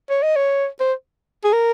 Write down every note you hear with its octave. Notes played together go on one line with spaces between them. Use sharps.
C#5
D#5
C#5
C5
G#4
A#4